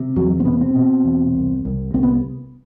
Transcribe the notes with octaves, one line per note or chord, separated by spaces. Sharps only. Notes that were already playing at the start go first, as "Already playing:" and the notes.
Already playing: C3
E2 F#3
C4
B2 B3
C4
B2
E2
C2
C2
C2 C4
B3